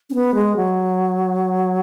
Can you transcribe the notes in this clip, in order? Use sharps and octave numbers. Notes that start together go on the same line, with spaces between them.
C#4
B3
G#3
F#3